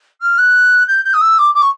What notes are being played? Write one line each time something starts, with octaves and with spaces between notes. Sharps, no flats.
F6
F#6
G6
G6
D#6
E6
D6
D6
C#6